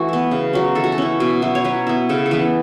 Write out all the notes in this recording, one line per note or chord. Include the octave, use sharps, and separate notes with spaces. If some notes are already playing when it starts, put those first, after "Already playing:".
Already playing: E3 A3 F#4
B3 E4
C#3
F#3 C#4
E3 A4
F#4
A4
C#4 E4
B2
F#3 B3 E4
C#5
F#3 B4
B3 E4
C#3 A4
A4
E3 B3 B4